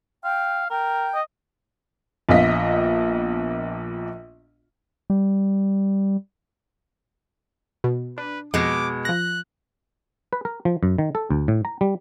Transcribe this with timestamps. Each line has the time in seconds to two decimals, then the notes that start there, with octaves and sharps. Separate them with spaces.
0.24 F5 G5
0.70 A#4 G5
1.14 D#5
2.29 A#1 A#2 B3 F4 D#5 B6
5.10 G3
7.84 B2
8.18 D4 B4
8.54 F2 B2 G#3 D6 A#6
9.05 F3 F#6 A#6
10.33 B4
10.45 A#4
10.65 F3
10.83 F#2
10.98 D#3
11.15 A4
11.30 D2
11.48 A2
11.65 A#5
11.81 G3